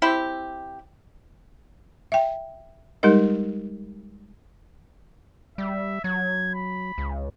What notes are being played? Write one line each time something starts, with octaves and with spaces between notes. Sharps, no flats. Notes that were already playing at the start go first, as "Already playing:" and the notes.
C4 E4 G4
E5 G5
G3 G#3 D#4 G4 A#4 D#5
G3 E5
F#3 G#6
B5
C#2